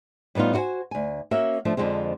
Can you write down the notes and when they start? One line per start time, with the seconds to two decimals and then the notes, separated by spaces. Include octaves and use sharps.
0.35 A2 G3 B3 D#4 F4
0.54 E4 F#4 A#4 C5 G#5
0.91 D2 G#5
1.31 A#3 C#4 F#4 E5
1.65 F3 A3 D4
1.77 F2 D3 F3 G#3 C4